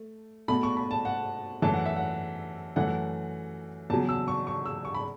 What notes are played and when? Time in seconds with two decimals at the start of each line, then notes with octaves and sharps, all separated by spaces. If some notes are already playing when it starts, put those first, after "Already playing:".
Already playing: A3
0.48 B2 A3 B5
0.63 C#6
0.77 B5
0.91 A5
1.05 F#5
1.62 F#2 E3 A3 A5
1.74 F#5
1.86 E5
1.96 F#5
2.76 F#2 E3 A3 F#5
3.90 E2 C#3 F#3 A5
4.09 E6
4.28 C#6
4.47 C#6
4.66 E6
4.85 C#6
4.94 B5